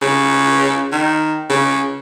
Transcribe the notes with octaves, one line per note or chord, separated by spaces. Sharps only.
C#3
D#3
C#3